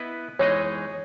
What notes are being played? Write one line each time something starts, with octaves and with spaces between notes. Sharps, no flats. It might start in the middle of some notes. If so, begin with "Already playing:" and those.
Already playing: B3 E4 B4 D#5
E3 G#3 D#4 G#4 C#5 D#5